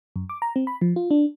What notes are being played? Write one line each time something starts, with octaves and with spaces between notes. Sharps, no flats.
F#2
D6
A#5
C4
B5
F3
F4
D4